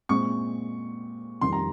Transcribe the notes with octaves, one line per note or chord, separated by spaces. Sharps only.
A#2 G#3 C4 C#6
F2 D#3 G3 C6
A#5